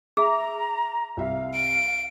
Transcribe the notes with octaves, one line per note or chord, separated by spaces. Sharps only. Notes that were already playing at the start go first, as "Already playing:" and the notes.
G#4 E5 A#5
C2 E5 F5
D7